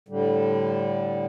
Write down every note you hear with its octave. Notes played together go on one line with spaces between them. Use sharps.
A2 D3 G3